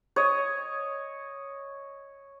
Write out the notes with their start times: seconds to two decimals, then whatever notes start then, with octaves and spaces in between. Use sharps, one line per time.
0.16 C#5 D#5